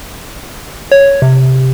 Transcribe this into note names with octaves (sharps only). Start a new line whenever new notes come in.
C#5
C3